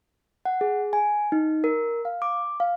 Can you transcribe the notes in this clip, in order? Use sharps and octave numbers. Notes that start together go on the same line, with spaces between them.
F#5
G#4
G#5
D#4
A#4
F5
D6
F5